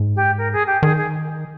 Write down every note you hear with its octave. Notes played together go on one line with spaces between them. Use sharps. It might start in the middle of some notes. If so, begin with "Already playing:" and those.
Already playing: G#2
G4
A#4
G#4
G4
D#3 G#4
G#4